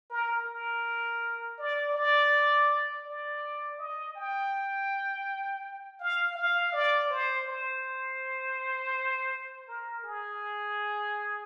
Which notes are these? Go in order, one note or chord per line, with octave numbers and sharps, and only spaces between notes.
A#4
A#4
D5
D5
D5
D#5
G5
F5
F5
D5
C5
C5
A#4
G#4